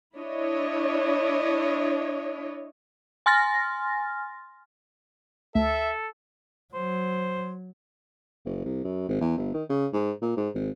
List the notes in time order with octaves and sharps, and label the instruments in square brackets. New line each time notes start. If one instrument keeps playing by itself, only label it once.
[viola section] D4 E4 C#5 D#5
[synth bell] G#5 C6 F6 A6 A#6
[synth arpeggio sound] D2 [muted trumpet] A4 [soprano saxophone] E5
[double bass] F#3 [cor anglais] C5
[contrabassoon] F#1
C2
F#2
G#1
E2
G1
D#3
C#3
G#2
A#2
G#2
G#1